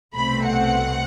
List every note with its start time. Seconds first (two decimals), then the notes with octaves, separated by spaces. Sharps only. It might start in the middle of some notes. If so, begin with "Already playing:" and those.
0.14 C2 B2 A3 C4 B5
0.45 F#5